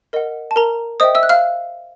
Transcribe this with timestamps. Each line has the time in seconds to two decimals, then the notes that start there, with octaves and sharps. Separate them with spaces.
0.13 A#4 D#5 F#5
0.51 A5
0.56 A#4 A#5
1.00 C5 D#5 E5 G5 D#6
1.15 E5 E6
1.23 F#6
1.29 F5 F6